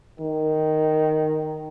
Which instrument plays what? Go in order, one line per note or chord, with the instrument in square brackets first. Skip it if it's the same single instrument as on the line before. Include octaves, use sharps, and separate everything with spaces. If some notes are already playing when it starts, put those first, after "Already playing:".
[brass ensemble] D#3